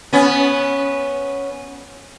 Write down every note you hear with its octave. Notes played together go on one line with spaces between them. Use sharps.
B3 C#4